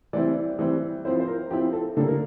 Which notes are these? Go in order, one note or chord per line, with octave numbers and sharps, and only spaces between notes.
E3 G3 C4 E4 D5
E3 G3 C4 E4
F3 C4 E4 C5
C5
A#4
F3 C4 E4 G4
A4
D3 G3 A#3 A4
A#4